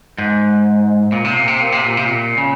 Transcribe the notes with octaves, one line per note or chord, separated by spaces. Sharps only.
G#2
A#2
C3
A#2
C3
A#2
C3
A#2
C3
A#2
C#3